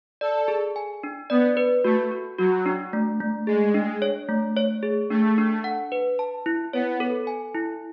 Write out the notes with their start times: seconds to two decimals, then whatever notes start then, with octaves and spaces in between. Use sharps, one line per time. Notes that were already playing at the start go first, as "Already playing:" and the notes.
0.21 A4 D5
0.48 G#4
0.76 G#5
1.03 D4
1.30 B3 D5
1.57 B4
1.84 A3 F#4
2.12 F#4
2.38 F#3 F#4
2.66 D4
2.93 A3
3.20 A3
3.47 G#3 G#4
3.74 D4
4.02 C#5
4.29 A3
4.57 C#5
4.83 G#4
5.10 A3 D4
5.38 D4
5.64 F#5
5.92 B4
6.19 A5
6.46 E4
6.73 B3 C#5
7.00 A4
7.27 G#5
7.55 E4